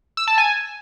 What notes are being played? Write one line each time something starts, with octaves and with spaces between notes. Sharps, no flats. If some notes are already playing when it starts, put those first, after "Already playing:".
E6
A5
G#5